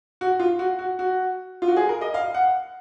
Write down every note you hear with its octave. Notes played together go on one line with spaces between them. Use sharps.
F#4
F4
F#4
F#4
F#4
F4
F#4
G#4
A#4
D#5
F5
F#5